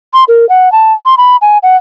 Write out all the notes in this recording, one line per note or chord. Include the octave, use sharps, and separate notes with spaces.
C6
A#4
F#5
A5
C6
B5
G#5
F#5